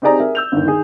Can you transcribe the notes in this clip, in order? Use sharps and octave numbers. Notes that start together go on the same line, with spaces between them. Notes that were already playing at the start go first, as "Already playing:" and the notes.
C4 D#4 G4 G#4 D5 A#5
G#4 A#4 E5
E6 G6 F7
G1 D#2
D#3 G#4